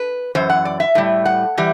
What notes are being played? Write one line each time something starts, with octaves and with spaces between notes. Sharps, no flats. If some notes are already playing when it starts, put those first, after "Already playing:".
Already playing: B4
F#2 E3 C5
F#5
D5
E5
A2 G3
F#5
E3 G3